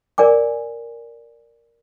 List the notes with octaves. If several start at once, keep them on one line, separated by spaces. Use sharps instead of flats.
A#4 D5 G#5 D6